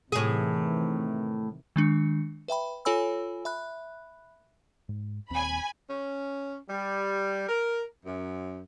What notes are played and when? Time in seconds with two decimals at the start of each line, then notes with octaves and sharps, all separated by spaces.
0.12 A2 C3 D#3 E3 G#4
1.76 D#3 G#3 D4 C#7
2.48 B4 E5 G5 B5
2.85 F4 A4 C#5 G#5 B5 E6
3.45 E5 B5 F#6
4.89 G#2
5.30 D#1 D#2 C4 G#5 B5
5.90 C#4
6.69 G3
7.49 A#4
8.06 F#2